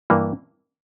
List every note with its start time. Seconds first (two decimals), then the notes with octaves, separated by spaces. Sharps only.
0.10 G2 E3 A#3 E4